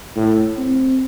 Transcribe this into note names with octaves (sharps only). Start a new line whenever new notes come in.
A2
C4